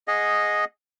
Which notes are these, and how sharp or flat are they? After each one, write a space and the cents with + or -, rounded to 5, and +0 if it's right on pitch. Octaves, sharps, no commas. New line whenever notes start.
G#4 +0 D#5 +0 F#5 -30